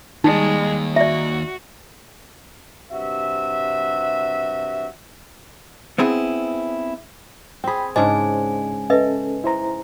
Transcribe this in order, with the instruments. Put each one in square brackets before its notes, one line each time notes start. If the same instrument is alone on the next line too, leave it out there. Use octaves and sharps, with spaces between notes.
[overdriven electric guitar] D#2 [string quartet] G3 G#3 [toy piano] D#4
[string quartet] F#4 [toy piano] D5 E5
[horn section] G2 C3 F#4 E5
[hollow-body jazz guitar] B3 C4 E4 G#4
[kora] C4 G#4 [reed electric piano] G5 B5
[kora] G#2 C#3 D4 [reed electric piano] C5 [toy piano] D#5 [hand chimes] G#5
[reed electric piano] C#4 A4 [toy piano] B4 D#5 E5
[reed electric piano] E4 C5 A#5